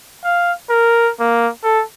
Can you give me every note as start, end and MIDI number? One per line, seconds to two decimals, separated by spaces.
0.24 0.52 77
0.70 1.11 70
1.20 1.49 58
1.63 1.82 69